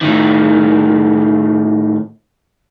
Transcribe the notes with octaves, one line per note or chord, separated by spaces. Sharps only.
A2 D#3